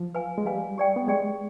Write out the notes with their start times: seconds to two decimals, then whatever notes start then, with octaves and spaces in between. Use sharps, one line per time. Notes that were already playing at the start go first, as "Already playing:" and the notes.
Already playing: F3
0.15 B4 F5 G#5
0.38 G#3
0.46 G3 B4 F5 G#5
0.78 G4 D5 G5
0.96 B3
1.08 G#3 G4 D5 G5